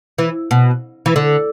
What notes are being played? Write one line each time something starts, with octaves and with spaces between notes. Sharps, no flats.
E3
B2
E3
D3